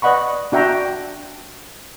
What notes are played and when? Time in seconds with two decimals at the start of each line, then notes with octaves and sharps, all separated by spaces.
0.02 B4 D5 D#5 F#5 B5 C#6
0.52 D4 F#4 E5 G5 A#5